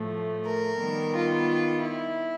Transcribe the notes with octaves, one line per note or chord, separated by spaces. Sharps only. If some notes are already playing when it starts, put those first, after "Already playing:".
Already playing: A2 F3 A3
A#4
D#3 G3 B3
F4
E4